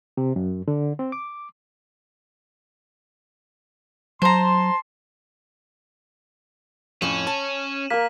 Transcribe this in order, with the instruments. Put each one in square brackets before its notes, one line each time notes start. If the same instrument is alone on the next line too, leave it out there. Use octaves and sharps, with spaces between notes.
[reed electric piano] C3
F#2
D3
C4
D6
[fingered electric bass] F#3 [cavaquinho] C5 A#5 [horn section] A5 C6
[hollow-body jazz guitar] F2 A2 [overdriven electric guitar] C#4 [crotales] D#7 E7 F#7
[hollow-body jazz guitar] A5
[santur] A#3 A#4 [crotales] B6